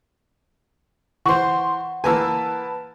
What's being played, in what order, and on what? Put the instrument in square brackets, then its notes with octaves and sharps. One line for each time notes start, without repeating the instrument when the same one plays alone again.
[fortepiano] E3 C5 [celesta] F#5 [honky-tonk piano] C6 C#6
[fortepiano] E3 A#3 G#5 [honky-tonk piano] B4 A5 E6